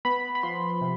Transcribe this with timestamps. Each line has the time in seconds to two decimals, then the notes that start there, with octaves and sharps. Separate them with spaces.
0.05 B3 B5
0.35 B5
0.43 F3 C6
0.81 C3